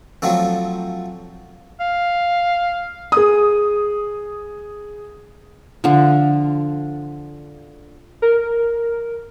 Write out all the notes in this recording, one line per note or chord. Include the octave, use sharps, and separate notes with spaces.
F3 F#3 A3 C4
F5
G#4 D#6
D3 F3
A#4